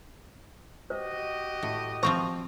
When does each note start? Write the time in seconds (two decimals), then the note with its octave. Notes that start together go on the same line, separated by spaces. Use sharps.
0.90 F#4 G4 C5 D#5
1.63 A2
2.03 F3 C4 C5 A#5 C#6